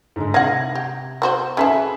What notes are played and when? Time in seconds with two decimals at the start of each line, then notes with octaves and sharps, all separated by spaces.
0.16 G#2 D3 G#3
0.34 C3 F5 F#5 G#6 A#6
0.75 G4
1.22 B3 F#4 C5
1.57 C#4 D#4 G#4 A4 B4 E5